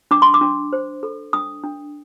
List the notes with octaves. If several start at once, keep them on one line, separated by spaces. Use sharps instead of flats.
D4 D6
C6
D6
D4
C5
A4
D4 D#6
D4